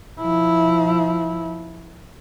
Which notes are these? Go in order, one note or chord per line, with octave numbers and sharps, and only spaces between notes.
F3 E4